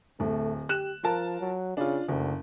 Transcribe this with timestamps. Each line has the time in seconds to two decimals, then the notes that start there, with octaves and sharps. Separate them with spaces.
0.20 D1 A3
0.69 G4 F#6 E7
1.04 F3 F4 A#4 A5
1.41 F#3
1.77 C#3 D4 F4
2.08 F#1 D2